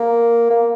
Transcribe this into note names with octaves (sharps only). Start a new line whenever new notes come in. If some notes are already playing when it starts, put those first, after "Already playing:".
Already playing: A#3
A#3